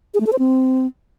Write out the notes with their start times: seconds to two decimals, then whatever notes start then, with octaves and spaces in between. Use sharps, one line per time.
0.14 G#4
0.20 A3
0.26 A4
0.33 C5
0.39 C4